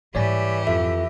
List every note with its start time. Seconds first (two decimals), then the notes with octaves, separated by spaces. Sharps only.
0.15 G#2 E3 G3 G4 C#5 D5 G#5
0.67 F2 F4 A4 E5